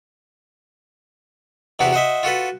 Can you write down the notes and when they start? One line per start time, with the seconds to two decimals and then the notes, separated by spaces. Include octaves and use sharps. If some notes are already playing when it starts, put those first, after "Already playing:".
1.79 E2 C3 B3 E4 F#4
1.92 F#4 C5 D#5 E5
2.23 F4 F#4 A4 B4